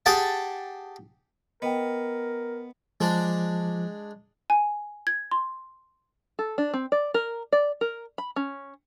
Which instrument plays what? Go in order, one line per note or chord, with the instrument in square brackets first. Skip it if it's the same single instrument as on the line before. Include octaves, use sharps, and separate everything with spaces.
[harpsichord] G4 G#4 F#5 G#5 A5
[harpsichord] B3 [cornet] A#4 [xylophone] D#5 G5
[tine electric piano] F3 [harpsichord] G#3 D4
[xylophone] G#5
G#6
C6
[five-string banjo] A4
D4
C4
D5
A#4
D5
A#4
B5
C#4